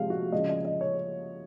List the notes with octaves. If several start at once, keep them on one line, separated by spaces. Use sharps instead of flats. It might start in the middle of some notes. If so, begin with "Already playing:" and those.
Already playing: C3 F3 G#3 F5
F#4
C#3 F3 G#3 D#5
D#5
D#5
C#5